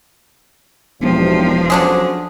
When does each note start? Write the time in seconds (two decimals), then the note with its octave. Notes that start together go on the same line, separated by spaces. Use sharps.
1.01 E1 B1 G2 C3 F3
1.70 D3 F#3 C#4 D4 G#4 C5